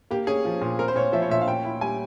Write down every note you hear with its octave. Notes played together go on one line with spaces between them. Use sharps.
A#3 G4
C#4 G#4
F3
A#2
C4 A#4
C5
A#2 C#5
F3 E5
C#5
A#2 E5
F5
C#4 G5
E4
G3 G#5